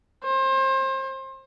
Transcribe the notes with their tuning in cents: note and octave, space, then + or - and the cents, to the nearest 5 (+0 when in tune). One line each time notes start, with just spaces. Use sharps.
C5 +30